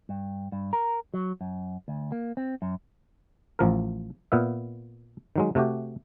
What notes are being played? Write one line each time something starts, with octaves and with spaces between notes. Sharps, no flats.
G2
G2
A#4
F#3
F#2
D2
A#3
C4
F#2
A1 F3 A#4
A#2 B3 E5
D#3 F#3 G#3
C3 A3 F#4 G4